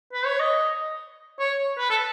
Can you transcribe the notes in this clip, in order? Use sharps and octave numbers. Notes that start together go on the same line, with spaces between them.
B4
C#5
D#5
C#5
B4
A4